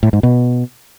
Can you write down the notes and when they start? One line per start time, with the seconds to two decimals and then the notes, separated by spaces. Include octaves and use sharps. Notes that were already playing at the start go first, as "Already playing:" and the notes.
0.03 A2
0.13 G#2
0.23 B2